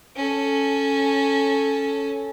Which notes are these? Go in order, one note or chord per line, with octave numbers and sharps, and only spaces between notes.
C#4 A4